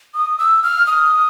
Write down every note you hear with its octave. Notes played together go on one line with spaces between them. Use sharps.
D#6
E6
F6
D#6